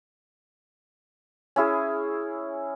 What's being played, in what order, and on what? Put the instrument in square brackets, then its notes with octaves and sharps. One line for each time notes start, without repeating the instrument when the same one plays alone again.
[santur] C#4 E4 G#4